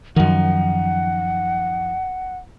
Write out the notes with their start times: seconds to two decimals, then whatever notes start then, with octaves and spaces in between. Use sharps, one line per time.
0.16 F#2 D#3 F3 D#4 F#5